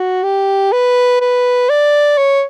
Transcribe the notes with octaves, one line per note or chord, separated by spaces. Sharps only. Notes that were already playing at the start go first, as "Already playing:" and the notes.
Already playing: F#4
G4
B4
B4
D5
C#5